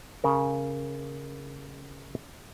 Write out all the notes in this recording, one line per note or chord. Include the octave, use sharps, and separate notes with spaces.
C#3 A#4